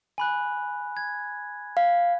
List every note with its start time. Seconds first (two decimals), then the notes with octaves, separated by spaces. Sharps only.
0.18 G#5 B5 F#6
0.97 G#6
1.77 F5